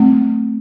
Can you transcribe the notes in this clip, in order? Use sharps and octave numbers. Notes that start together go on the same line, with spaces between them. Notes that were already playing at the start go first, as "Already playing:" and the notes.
Already playing: F#3 A3 C4